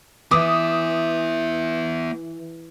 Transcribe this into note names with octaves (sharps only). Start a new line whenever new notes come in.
E3 B3 E5 D6 D#6